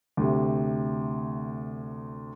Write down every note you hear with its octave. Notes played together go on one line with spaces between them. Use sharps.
D2 C3